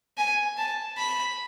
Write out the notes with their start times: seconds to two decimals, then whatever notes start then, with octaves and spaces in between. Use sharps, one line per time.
0.18 G#5
0.58 A5
0.98 B5